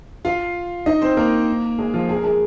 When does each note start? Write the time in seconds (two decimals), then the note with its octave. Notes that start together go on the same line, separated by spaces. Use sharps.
0.25 F4 F5
0.86 D#4 D#5
1.02 C4 C5
1.17 A#3 A#4
1.78 G#3 G#4
1.94 F3 F4
2.09 G#4
2.17 A#4
2.24 G#3 G#4